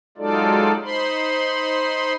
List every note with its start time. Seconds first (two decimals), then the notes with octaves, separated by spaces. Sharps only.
0.17 F#3 G#3 D#4 F4 A4 D5
0.84 D#4 C5 B5 C6